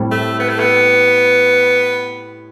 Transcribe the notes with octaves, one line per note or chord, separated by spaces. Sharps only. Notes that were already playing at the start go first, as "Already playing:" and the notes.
Already playing: A2 G3 C4 G4
A3
B3
A3
B3